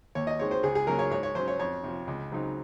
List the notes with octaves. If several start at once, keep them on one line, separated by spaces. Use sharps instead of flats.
D#2 C#5
D#5
D#3 G#3 C4 C#5
C5
C#2 G#4
G#4
C#3 F#3 A#3 C#4 A#4
C#5
G#2 C#5
C#5
F#3 C#4 C5
C#5
F2 C#5
C3 F3
C#2
C#3 F#3 C4 D#4